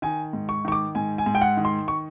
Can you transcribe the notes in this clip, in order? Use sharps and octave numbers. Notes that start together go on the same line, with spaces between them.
D#3 G#5
G#2
C#6
D#3 C#6
D6
G#2 G#5
G#5
G#2
G5
F#5
D#3
C6
C#6